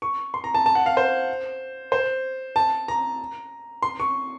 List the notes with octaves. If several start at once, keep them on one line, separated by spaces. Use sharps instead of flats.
C#6
C6
A#5
A5
A5
F#5
F5
C5
C5
A5
A#5
C6
C#6